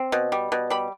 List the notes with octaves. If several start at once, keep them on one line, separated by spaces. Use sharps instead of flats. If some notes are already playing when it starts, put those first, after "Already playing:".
Already playing: C4
B2
G3
B2
G3 B5